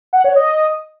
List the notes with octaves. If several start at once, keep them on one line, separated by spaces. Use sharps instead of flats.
F#5
C#5
D#5